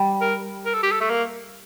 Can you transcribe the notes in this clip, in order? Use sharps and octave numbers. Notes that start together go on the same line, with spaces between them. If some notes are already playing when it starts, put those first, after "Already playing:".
Already playing: G3
A#4
A#4
A4
G4
A4
A3
A#3